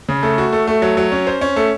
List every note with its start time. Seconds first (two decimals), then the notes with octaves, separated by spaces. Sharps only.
0.09 C#3
0.23 A3
0.38 F#4
0.53 A3
0.67 A3
0.82 F#3
0.97 F#3
1.12 C#4
1.27 C5
1.41 C#4
1.56 A3